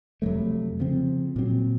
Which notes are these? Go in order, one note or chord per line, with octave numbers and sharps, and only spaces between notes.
F2 C3 F#3 A3
C#3 F3 C4
A#2 F#3 C4